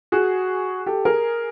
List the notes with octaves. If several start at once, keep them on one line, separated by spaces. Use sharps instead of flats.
F#4 G#4
G4 A4
G#4 A#4